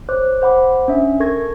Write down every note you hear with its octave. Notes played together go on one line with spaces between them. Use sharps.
C5 C#5 D6 F#6
C5 F#5 B5 D6
C#4 D4 E5
A4 A#4 C#6 G#6 A#6